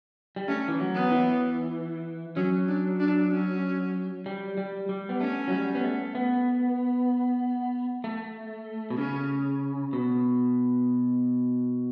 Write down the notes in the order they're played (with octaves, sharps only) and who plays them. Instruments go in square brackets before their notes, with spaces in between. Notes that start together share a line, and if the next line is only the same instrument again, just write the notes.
[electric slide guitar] G3
[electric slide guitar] A3 [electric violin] C#4
[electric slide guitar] E3
F#3
[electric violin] B3
[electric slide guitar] E3
[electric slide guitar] F#3 [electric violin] C#4
[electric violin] D4
D4
C#4
[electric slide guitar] G3
G3
G3
B3
[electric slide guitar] A3 [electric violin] C#4
[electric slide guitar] F#3
G3
B3
A3
B3
A3
B2
[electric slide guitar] C#3 [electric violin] C#4
[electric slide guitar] B2